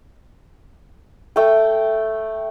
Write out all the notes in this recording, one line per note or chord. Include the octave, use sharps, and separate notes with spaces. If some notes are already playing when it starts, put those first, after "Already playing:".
A3 G5